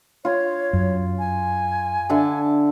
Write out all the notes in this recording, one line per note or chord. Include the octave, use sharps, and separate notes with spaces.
F4 C#5 C6
F#2
G#5
D3 E5 A5